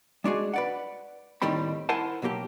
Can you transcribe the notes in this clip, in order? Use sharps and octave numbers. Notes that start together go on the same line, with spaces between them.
G#3 D4 F#4 G#4
B4 D5 F#5
D#2 A2 D#3 G3 C4 B5
E4 A#4 C5 F#5 G#5 A5
B2 F#3 A#3 G4